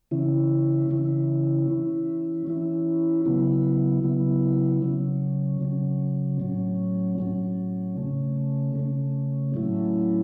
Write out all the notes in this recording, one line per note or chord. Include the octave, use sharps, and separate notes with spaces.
C#3 E3 C#4 E4
C#3 E3 C#4 E4
E3 C#4 E4
E3 C#4 E4
C#3 F#3 B3 E4
C#3 F#3 B3 E4
C#3 F#3 C#4
C#3 F#3 C#4
A2 F#3 C#4
A2 F#3 C#4
C#3 A3 C#4
C#3 A3 C#4
A2 F#3 A3 C#4 E4